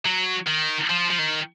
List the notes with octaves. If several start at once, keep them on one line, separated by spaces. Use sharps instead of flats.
F#3
D#3
F3
F3
D#3